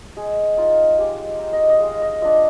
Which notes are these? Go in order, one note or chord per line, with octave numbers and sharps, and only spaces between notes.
G#3 G#4
D#4 F4
G#3 G4
D#4
D#5
D#5
G#3 F5
D#5
D4 F4 D#5